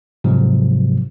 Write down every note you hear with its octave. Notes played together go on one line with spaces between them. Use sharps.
G#2 C3 F3 F#3 G#3